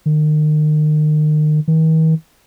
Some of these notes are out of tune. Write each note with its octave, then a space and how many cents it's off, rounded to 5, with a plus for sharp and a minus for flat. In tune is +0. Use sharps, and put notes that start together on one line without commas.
D#3 -35
D#3 +45